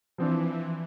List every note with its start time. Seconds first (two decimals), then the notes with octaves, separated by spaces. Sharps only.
0.18 E3 F3 C4 D4